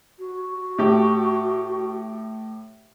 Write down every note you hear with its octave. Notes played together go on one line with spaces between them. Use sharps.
F#4
A2 G4